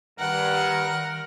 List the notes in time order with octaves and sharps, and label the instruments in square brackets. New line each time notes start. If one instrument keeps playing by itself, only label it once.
[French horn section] G2 [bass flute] D#3 [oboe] A#4 [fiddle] F#5